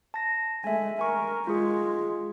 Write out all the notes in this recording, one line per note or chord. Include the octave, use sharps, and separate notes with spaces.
A5 A#6
G#3 A3 E5 G#5
A#4 G#5 C#6
G#3 F4 G#4